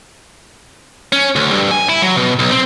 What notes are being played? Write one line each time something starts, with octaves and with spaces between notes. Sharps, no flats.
C#4
D2
G2
G#5
E4
F#3
B2
B1
C4